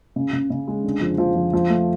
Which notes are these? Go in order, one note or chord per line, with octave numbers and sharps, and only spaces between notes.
C#3
C#3
C#3
G#3
D3
F2
F3
F2
F3
A3